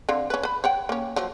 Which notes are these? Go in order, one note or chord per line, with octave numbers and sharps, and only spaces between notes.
D3 C4 F5
C#4 B4
B4 B5
C#5 F#5 G5
A#3 C#4
F3 F#3